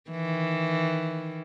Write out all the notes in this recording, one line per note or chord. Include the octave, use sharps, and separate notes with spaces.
D#3 E3